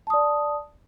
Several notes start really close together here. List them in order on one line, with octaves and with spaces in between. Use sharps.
A5 D#6 D5